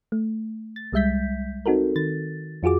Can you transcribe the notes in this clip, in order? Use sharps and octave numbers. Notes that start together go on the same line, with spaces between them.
A3
A6
C2 G3 G#3 E5 G6 B6
C4 D#4 F#4 A4 A#4
D#3 A6
F2 F4 F#4 G#4 D6